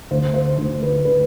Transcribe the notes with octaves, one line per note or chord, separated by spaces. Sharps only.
D2 C5
C5
D2
B4
D3 B4